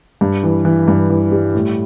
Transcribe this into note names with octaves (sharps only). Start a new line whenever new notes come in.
G2
E3
E3
G2
E3
G3
A2